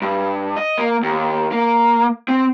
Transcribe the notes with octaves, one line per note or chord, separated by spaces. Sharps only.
G2
D#5
A#3
D#2
A#3
C4